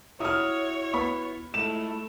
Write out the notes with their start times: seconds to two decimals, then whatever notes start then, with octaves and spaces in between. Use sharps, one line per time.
0.20 E4 F#4 C#5 E5 D#6 F6
0.93 B3 B5 C#6
1.54 G#2 A3 E4 E7